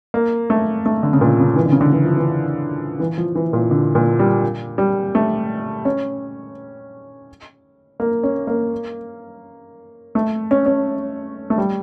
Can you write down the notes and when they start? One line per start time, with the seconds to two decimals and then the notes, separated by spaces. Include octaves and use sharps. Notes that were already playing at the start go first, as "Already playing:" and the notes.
0.14 A#3
0.50 A3
0.86 A3
1.03 D3
1.13 C#3
1.21 A#2
1.40 C#3
1.56 E3
1.65 D3
1.72 C#3
1.81 D3
1.93 E3
2.04 F3
2.17 E3
3.00 E3
3.18 F3
3.35 E3
3.53 A#2
3.71 D3
3.95 A#2
4.19 G3
4.78 G3
5.15 A3
5.85 C#4
8.00 A#3
8.23 C#4
8.47 A#3
10.15 A3
10.51 C#4
10.66 C#4
11.50 A3
11.58 G3